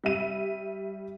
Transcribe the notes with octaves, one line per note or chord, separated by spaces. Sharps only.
G3 E5 D#7